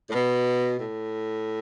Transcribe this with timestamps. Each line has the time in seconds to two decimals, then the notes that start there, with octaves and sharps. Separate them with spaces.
0.08 A2
0.13 B2
0.79 A2